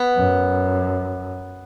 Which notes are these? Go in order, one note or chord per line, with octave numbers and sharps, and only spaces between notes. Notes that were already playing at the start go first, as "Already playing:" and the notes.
Already playing: B3
F#2